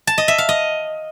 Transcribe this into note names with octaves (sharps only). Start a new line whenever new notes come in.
A5
D#5
E5
F5
D#5